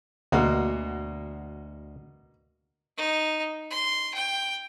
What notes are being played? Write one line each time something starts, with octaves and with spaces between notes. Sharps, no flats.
D2 B2 A#3 F#4
D#4
C6
G5